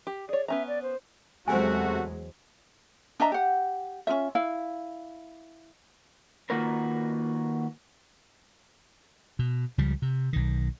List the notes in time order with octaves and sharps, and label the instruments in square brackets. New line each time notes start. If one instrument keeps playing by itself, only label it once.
[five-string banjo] G4
[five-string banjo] G#4 C#5 [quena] D5
[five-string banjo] B3 C#4 A#5 [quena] E5
[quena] D5
C5
[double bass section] E2 F#3 G#3 [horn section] C3 A3 F#4 [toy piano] C5 G#5
[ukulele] D4 D#5 E5 A#5
G4 F#5
C#4 D#4 F4 E5
E4 F5
[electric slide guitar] D#3 A#3 F4 F#4 A#4 B4
[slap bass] B2
C#2 C#3 F3 G3
C3
B1 D#3